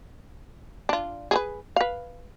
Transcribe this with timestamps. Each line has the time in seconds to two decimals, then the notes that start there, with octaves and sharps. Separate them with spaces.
0.89 D4 F4
1.31 G#4 A4 B4
1.76 B4 F5